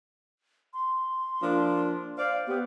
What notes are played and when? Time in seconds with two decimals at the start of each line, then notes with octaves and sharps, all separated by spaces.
0.74 C6
1.42 F3 A#3 D4
2.18 C5 D5 F5
2.47 B3 G4